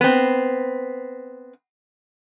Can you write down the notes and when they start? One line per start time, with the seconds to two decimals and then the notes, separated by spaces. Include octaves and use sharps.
0.01 B3 C4